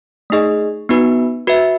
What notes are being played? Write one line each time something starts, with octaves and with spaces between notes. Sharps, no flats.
A3 D#4 G#4 D#5
B3 D#4 F#4 B4
F#4 B4 E5